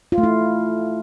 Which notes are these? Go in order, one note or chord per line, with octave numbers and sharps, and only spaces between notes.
F4
A3
E4